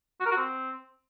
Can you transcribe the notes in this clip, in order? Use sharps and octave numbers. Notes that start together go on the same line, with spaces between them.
F#4
A#4
F#4
C4